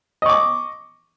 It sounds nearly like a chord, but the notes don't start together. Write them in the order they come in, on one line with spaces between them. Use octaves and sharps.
D#5 C#6 D6